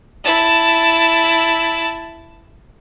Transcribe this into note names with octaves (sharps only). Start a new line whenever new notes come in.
E4 A5